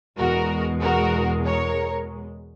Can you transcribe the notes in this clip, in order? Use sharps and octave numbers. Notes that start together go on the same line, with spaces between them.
E2 B2 G#3 F#4 A#4
F#4 A#4
A#4 C#5